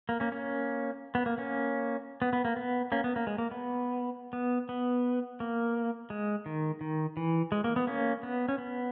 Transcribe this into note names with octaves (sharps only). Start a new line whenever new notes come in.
A#3
A#3 C#4
A#3 C#4
B3
A#3
A#3 C#4
B3
B3
A#3
B3
A#3 C#4
B3
A#3
G#3
A#3
B3
B3
B3
A#3
G#3
D#3
D#3
E3
G#3
A#3
B3
A#3 C#4
B3
C#4
B3